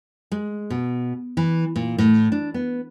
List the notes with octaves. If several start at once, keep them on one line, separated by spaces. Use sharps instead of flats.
G#3
B2
E3
A#2
A2
D4
B3